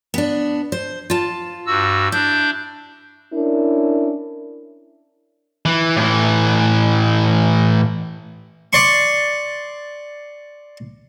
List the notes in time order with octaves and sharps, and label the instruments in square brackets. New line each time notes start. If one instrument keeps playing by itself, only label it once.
[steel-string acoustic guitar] B3 D4
C5
F4 A5
[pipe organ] G2 F#4 E6
[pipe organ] D4 G6 [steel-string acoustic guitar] E4
[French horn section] C#4 D4 E4 A#4
[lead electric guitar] E3
A2 E3
[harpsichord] D5 C6 C#6